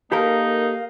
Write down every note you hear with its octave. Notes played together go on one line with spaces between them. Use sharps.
A#3 D#4 G4 A4 A#4 F5